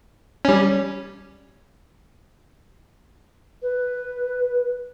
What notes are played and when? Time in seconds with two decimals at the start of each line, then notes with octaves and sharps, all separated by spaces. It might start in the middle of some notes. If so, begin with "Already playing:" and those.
0.45 G3 C#4
3.63 B4